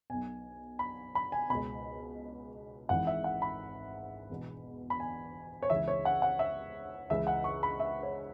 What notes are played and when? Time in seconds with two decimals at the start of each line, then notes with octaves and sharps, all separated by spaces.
0.10 B1 B2 G#5
0.79 B5
1.15 B5
1.32 G#5
1.50 C#2 B2 B5
2.89 G#1 G#2 E3 F#5
3.07 E5
3.24 F#5
3.42 B5
4.29 E1 E2 B2
4.90 B5
5.00 G#5
5.62 C#5
5.70 C#2 C#3 E3 E5
5.88 C#5
6.05 F#5
6.22 F#5
6.39 E5
7.10 C#2 C#3 E3 E5
7.27 F#5
7.44 C#6
7.63 B5
7.80 E5
8.03 C#5